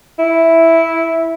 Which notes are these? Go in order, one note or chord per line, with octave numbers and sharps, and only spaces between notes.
E4